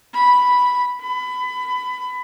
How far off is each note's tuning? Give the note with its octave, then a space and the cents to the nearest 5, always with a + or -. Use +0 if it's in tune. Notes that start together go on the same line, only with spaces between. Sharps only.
B5 +0
B5 +25